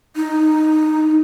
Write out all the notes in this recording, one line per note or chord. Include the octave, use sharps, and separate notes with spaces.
D#4